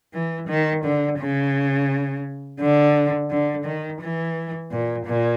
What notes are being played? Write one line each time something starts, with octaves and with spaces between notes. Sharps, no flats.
E3
D#3
D3
C#3
D3
D3
D#3
E3
A#2
A#2